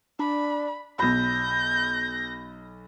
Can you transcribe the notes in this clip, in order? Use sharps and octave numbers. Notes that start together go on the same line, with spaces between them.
D4 B5
B1 B5 G6 A#6